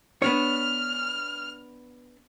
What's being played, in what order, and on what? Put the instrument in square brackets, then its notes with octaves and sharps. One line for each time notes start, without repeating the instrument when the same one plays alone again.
[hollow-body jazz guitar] B3 D4 C#5 [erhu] F6